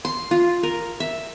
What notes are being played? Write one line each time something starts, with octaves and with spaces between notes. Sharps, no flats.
C6
F4
A#4
E5